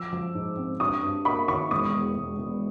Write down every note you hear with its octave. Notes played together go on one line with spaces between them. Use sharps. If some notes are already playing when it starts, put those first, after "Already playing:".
Already playing: F3 D6 E6
F3
G#2
C4
G2 C#6 D#6
G2
A#3 B5 C#6
D#3 B5 C#6
E1 C#6 D#6
E2
E1
E1